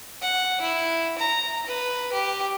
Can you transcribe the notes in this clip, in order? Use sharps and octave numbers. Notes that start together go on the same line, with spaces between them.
F#5
E4
A#5
B4
G4